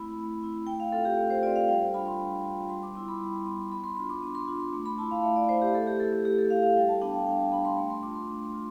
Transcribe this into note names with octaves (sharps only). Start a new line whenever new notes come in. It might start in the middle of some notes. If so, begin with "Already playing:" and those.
Already playing: A3 C4 E4 B5
A3
C4 E4
A3 G5
F5
C4 F4 A4
G4
A3 A4
C5
C4 F4 D5
F5
G3 G5
D4 F4 B5
C6
G3
D4 F4
G3 C6
D6
B3 E4 C6
B5
G3
B3 E4 C6
B3 B5
C6
D4 F4 C6
D6
B3 C6
C6
D4 F4 D6
C6
A3 D6
B5
E4 A5
F5
A3 E5
D5
E4 C5
G4
A3 A4
G4
E4 A4
A4
A3 G4
A4
E4 F5
F5
G3 G5
A5
B3 D4 G5
F5
G3 G5
A5
B3 D4 B5
C6
A3 C6
C6
D4 F4 D6
C6
A3
F4